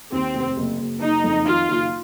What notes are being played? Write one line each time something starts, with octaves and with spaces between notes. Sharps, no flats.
D#2 C4
F1
F#1
F#1
F#1 D#4
F2
D#3 F4
F#1